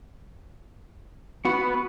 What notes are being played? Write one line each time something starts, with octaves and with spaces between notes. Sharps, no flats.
B3 F#4